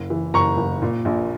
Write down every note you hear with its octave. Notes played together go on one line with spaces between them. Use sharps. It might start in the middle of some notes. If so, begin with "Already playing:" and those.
Already playing: F#1
E3
F#1 A#5 C#6
F#1
A#2
A#1